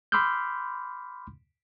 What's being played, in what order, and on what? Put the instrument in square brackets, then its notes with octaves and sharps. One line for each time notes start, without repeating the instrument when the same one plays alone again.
[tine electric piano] B5 C6 D6 E6 F6 G6